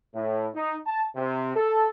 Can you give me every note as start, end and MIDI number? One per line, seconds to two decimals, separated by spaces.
0.15 0.49 45
0.55 0.76 63
0.87 1.05 81
1.16 1.52 48
1.56 1.89 69